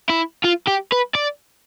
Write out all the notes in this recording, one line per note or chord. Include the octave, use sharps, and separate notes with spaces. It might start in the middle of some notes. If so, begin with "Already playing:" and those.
E4
F4
G4
B4
D5